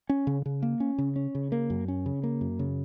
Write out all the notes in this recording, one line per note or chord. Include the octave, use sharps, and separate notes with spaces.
C#4
C#3
C#3
A#3
C#4
C#3
C#4
C#3
A#3
F#2
C#4
C#3
A#3
F#2
C#3